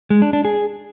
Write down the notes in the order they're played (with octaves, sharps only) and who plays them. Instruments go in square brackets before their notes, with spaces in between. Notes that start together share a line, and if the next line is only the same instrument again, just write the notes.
[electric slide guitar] G#3
D4
D4
G#4